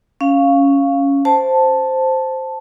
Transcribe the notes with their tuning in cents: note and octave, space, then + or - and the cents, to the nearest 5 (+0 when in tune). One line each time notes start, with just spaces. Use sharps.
C#4 +0 F5 -5
C5 +0 A5 +0